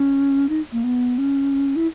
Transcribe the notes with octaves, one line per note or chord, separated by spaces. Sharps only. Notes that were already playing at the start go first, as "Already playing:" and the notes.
Already playing: C#4
D#4
A#3
B3
C#4
E4